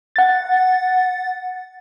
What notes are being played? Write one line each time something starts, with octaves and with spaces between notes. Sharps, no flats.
F#5 A6